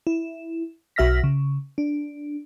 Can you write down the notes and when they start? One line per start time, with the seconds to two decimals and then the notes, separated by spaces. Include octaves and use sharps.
0.07 E4
0.96 B1 F#4 E5 F6 A#6 B6
1.24 C#3
1.78 D4